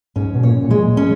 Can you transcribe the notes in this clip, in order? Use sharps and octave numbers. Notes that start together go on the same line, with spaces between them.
G#2 C#4
B2
A#2 C#5
A#2
G#3
A#2
C#4